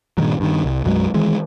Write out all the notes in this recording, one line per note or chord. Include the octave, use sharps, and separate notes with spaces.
G2 A#2 D#3 F#3
G2 D#3
C2
B1 F#2 F#3 G#3
D#3 E3 G#3